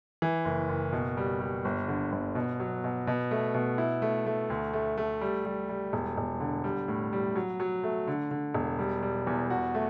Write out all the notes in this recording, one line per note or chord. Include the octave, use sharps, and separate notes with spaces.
E3
F#1
F#1
B2
G3
G3
G1
D3
G1
B2
F#3
B2
B2
A3
B2
E4
A3
A3
D2
A3
A3
G3
G3
G3
E1
E1
D3
G3
A2
G3
F#3
F#3
A3
D3
D3
E1
G3
G3
E2
F#4
A3